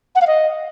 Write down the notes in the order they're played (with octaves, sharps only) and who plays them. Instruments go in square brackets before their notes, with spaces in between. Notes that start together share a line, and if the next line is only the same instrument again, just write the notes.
[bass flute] F#5
F5
D#5